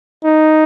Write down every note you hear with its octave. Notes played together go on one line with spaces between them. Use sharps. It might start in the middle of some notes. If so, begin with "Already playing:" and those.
D#4